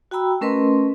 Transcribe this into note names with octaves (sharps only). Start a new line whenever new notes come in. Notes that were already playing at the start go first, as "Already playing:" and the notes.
F#4 G5 A#5 B5 E6
A3 C#4 A#4 B4 D#5 C6